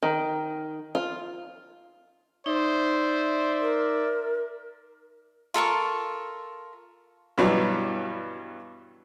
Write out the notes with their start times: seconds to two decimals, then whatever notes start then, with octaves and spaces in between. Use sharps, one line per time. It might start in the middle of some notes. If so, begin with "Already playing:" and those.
0.02 D#3
0.95 F4
2.46 D#4 C5 D5 E5
3.60 A#4
5.54 F4 A4 A#4 C#6
7.38 G2 B2 E3 F#3 G3